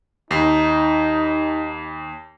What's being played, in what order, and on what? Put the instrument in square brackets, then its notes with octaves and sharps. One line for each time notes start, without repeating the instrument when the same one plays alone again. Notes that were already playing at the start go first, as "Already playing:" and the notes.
[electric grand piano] D#2 C7 [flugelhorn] D#4